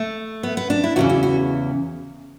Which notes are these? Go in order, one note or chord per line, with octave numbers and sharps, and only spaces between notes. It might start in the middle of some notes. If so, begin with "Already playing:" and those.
Already playing: A3
B3
B3
D4
E4
E2 C#3 E3 F#4
F#4
F#4